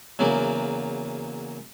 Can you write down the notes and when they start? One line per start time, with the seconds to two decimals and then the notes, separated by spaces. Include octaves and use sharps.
0.19 E2 C#3 F#3 A#3